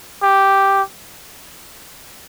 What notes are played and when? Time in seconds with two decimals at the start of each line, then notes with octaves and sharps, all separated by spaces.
0.23 G4